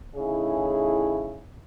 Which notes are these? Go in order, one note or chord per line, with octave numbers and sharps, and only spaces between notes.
A2 C#3 D#4 E4 G#4